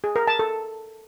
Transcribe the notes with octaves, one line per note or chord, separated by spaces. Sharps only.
G#4
A#4
A5
A4